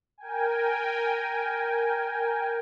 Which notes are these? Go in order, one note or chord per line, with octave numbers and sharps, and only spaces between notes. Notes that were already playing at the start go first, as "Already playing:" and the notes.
A#4 G5 G#5